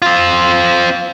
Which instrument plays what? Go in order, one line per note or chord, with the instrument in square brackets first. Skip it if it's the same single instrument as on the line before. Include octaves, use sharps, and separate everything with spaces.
[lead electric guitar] C4 F4